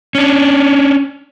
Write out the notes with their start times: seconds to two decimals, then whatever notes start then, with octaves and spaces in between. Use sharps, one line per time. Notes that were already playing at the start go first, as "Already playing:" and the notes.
0.15 C#4 D4